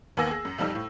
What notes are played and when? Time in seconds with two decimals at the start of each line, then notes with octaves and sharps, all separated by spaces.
0.17 D#2 A#3 B3 G#5 E6 A#6
0.31 G#4
0.45 F#2
0.58 B1 F2 G3 D#4 E6
0.75 A2